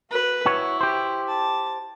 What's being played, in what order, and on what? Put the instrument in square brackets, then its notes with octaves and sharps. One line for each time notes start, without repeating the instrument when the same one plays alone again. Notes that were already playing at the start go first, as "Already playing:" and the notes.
[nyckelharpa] F#4 B4
[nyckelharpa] E4 [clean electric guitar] F#4 C#5
[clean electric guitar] G4 C5
[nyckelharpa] A5